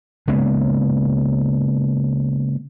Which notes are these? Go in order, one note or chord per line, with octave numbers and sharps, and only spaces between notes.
C#3 G#3 A#3 B3